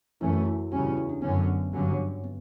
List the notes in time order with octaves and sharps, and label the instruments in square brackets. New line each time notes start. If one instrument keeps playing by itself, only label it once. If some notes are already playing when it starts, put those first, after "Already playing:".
[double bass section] F#2 E3 A3 C#4 [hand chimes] E4
[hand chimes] F#4
E4
[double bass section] E2 C#3 G3 C#4 [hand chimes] F#4
[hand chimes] E4
E4
D4
[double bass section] F#2 D3 F#3 C#4 [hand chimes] B3
[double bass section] G2 D3 F#3 C#4
[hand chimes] B3